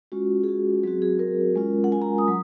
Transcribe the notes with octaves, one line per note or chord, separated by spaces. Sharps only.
G#3 C#4 F4 F#4
G#4
F#4
F#3 C4 F#4 G#4
G#4
A#4
G#3 C#4 F4
F#5
G#5
A#5
D#6
F#3